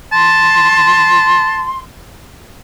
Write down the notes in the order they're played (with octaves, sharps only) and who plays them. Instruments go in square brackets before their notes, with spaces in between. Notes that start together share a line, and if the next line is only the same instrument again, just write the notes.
[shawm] A5 [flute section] C6